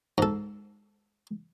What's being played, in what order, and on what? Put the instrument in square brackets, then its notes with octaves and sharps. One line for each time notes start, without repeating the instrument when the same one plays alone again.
[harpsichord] G#2 A4